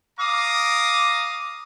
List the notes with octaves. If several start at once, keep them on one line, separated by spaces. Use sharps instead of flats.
F5 A#5 D6 D#6